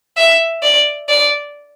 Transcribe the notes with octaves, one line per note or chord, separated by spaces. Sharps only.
E5
D5
D5